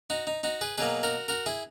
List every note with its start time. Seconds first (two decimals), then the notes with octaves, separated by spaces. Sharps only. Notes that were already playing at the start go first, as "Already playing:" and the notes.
0.10 D#4 F#4
0.27 D#4
0.43 D#4 F#4
0.61 G#4 B4
0.78 B2 F#3 A#3 G#4 B4
1.03 F#4 A#4
1.28 F#4 A#4
1.46 E4 G#4